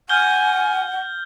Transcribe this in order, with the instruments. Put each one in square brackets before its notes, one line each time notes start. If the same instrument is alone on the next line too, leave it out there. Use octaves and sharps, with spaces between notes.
[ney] F#5 [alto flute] G#5 [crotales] F6 G6 G7